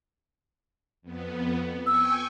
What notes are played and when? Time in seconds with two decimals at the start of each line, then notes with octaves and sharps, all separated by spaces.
1.02 F2 B3
1.87 G5 G#5 C#6 E6